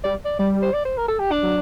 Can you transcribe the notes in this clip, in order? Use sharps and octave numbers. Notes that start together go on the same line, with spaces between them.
G3 D5
D5
G3 D5
C5
D5
C5
A#4
A4
G4
D4
F#3